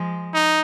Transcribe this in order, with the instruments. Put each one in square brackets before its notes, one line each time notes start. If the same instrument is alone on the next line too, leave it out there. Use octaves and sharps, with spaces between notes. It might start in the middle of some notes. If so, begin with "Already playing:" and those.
Already playing: [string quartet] F3 G#3
[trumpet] D#4